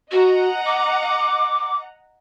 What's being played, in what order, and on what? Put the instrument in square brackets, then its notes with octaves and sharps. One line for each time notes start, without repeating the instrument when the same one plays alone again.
[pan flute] F#4 [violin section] D#5 F#5 A#5
[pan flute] D6